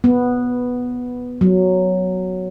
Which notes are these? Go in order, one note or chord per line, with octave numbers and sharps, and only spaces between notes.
B3
F#3